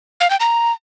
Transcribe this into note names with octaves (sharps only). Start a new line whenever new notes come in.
F5
G5
A#5